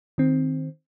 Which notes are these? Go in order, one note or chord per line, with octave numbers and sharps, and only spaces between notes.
D#3 C4